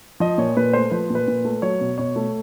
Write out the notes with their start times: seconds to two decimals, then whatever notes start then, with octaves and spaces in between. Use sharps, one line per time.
0.20 F3 D#5
0.38 A#2 C#5
0.57 A#2 B4
0.73 A3 C5
0.91 F3 B4
1.10 A#2 B4
1.28 A#2
1.45 A3
1.62 F#3 C#5
1.81 B2
1.98 B2 C#5
2.16 A3